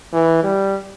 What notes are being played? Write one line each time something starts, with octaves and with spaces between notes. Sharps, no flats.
E3
G3